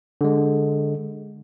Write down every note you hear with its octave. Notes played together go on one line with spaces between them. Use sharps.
D3 G#3